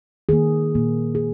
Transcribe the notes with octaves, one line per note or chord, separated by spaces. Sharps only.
D#3 A#3 G#4
A#2 A#3
G#4